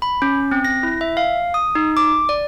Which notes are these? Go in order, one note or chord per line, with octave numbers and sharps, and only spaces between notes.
B5
C#4
C4
A#6
E4
E5
F5
D#6
D#4
D6
D5